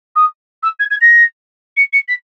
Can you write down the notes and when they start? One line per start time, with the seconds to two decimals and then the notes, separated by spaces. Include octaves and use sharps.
0.15 D#6
0.62 E6
0.79 G#6
0.90 G#6
1.00 A#6
1.76 C#7
1.92 C#7
2.08 B6